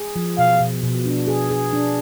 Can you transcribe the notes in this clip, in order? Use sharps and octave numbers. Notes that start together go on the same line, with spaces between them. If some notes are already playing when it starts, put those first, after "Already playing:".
Already playing: G#4
F3
B2 F5
B2
B2
D4
G#4
G#4
D4